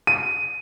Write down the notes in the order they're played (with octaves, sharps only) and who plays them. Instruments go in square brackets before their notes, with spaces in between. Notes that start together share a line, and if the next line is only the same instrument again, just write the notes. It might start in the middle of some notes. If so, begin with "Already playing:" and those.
[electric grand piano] D#7